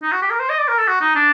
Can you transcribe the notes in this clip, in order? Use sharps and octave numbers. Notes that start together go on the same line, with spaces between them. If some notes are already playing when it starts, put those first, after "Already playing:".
D#4
F#4
G4
A#4
C5
D#5
D5
A#4
A4
F#4
D#4
D4